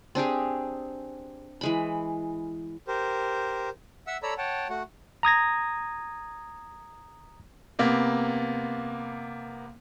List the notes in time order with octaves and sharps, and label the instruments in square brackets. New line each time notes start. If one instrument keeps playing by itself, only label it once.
[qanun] C4 D4 G4 G#4
E3 G#3 B5
[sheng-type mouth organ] G4 A#4 C5
E5 F#5 E6
A4 C#5 D5 A#5 B5 E6
C#5 F#5 G5 A5
A3 F#4 F#5
[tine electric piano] A#5 D#6 G#6 A#6
[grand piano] C3 A#3 B3